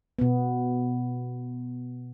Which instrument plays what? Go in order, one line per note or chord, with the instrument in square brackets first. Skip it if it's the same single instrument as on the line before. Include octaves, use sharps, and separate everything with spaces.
[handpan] B2 B3